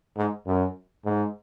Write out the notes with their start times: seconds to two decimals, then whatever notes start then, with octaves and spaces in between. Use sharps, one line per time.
0.17 G#2
0.46 F#2
1.05 G#2